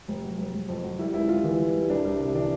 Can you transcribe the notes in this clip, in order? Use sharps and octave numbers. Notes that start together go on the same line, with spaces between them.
F1
F#3
F1
F1
F2
F#3
G3 E4
C#2 E4
G3 F4
E3
G3
G3
C2 D4
C2
C3
E3 D4